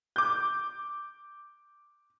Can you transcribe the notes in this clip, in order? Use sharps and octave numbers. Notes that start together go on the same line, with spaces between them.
D6 G6